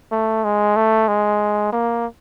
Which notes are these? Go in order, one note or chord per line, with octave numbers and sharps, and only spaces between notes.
A3
G#3
A3
G#3
A#3